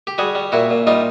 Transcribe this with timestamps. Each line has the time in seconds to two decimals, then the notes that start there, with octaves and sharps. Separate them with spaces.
0.07 G4
0.18 G3 F#4 G#4
0.35 G3
0.52 A#2 E4 F#4
0.70 A#2
0.87 G3 D#4 F4